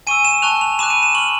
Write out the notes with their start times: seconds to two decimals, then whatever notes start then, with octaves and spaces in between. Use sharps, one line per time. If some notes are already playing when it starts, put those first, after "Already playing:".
0.07 G#5 C#6 E6 D#7
0.25 E7
0.42 A5 C#6 F#6 F7
0.61 F7
0.79 B5 D6 F#6 E7
0.90 D#7
1.03 E7
1.15 C#6 F6 F#7